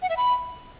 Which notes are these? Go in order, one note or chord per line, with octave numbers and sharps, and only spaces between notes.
F#5
E5
B5